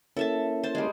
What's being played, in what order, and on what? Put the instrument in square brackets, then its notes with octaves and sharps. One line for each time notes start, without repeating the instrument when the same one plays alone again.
[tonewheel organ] A#3 C#4 E4 [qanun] A4 E5 A5
[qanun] C5 A5
G3 G#3